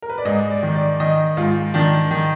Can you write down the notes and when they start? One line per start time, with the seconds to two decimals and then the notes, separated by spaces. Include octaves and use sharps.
0.02 A#4
0.10 B4
0.18 D5
0.25 G#2 D#5
0.50 D5
0.63 D#3
0.75 D5
1.00 D#3 D#5
1.37 G#2 F4
1.74 D#3 D4
2.11 D#3